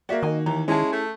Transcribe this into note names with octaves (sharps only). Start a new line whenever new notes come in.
A#3 F#4 D5 E5
D#3 D#5 G#5
D#2 E3 A#5
G#3 C#4 E4 G#4 A5
A3